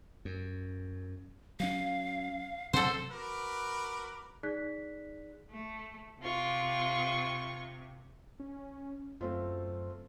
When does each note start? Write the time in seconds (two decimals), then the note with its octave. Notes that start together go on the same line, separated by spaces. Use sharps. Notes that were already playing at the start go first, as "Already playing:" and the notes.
0.25 F#2
1.60 F#3 C#4 F5
2.73 C3 F#3 A4 C5 F#5
3.12 F#4 A#4 B4 B5 D6
4.43 D#4 G#4 D5 F#6 B6
5.50 A3
6.22 C3 F4 C#6
8.40 C#4
9.21 F#2 A3 C4 F4